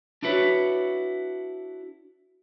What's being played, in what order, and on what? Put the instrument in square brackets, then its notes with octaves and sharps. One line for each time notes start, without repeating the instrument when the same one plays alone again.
[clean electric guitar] D4 E4 F#4 B4 C#5